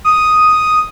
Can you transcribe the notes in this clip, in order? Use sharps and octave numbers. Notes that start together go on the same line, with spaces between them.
D#6